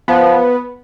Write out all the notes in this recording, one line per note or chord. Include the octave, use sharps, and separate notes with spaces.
F3 B3